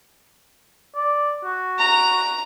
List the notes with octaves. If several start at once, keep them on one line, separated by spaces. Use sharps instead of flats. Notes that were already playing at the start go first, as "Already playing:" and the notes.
D5
F#4
A#5